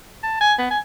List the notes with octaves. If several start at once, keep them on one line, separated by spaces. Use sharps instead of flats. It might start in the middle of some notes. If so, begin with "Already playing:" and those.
A5
G#5
B3
G#5